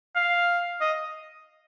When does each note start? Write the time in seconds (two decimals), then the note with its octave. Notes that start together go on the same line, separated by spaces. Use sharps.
0.16 F5
0.81 D#5